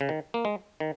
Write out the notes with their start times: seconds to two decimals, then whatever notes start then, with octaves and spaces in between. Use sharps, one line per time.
0.01 C#3
0.09 D#3
0.34 A#3
0.45 G#3
0.80 D#3